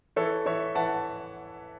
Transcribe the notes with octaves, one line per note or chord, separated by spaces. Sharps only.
E3 A4 C#5
E3 C#5 E5
E3 F#5 A5